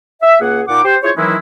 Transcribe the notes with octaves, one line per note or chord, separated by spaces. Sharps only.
E5
C#2 A#3 G#4 F#5
A#2 D#4 F#5 D6
G4 C5
E4 F4 G#4 C5 C#5
D#3 E3 F#3 G#3 C#4 E4